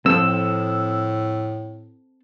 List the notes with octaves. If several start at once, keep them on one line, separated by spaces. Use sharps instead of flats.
F2 A2 C4 A4 E6